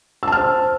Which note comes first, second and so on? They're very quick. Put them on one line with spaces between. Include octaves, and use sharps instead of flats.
E6 A5 F6 C5